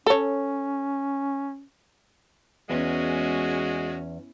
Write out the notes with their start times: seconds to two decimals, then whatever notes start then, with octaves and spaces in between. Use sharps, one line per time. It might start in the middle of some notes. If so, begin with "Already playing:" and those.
0.06 C#4 A4 C#5
2.70 E2 G#3 C#4 F#4